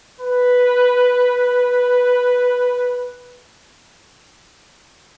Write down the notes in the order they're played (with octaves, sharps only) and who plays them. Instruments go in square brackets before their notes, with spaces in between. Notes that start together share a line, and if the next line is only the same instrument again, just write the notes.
[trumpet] B4